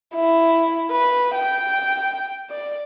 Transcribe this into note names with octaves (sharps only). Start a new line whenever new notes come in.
E4
B4
G5
D5